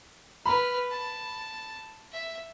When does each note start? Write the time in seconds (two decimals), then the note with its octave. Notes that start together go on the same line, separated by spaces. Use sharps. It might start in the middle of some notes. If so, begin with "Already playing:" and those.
0.46 B4 B5 F6
0.90 A5
2.12 E5